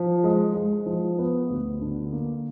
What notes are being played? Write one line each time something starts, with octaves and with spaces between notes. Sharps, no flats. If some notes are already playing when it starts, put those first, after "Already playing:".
Already playing: F3
G#3
G#3
F3
B3
D2
D3
A#3